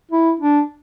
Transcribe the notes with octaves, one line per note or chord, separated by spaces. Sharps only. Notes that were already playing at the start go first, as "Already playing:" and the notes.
E4
D4